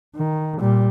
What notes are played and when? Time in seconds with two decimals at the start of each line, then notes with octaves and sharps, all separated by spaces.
0.16 D#3
0.60 A#2 G3